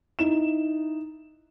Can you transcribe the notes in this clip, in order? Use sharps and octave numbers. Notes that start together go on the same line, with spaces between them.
D#4 E4 E7